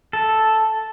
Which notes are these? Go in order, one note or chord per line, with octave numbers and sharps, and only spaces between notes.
A4